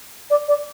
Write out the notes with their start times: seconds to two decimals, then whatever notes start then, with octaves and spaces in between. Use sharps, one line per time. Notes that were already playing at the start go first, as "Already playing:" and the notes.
0.30 D5
0.48 D5